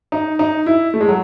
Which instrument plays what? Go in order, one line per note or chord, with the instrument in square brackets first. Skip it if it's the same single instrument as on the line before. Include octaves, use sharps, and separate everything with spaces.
[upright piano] D#4
D#4
E4
A3
G#3
F#3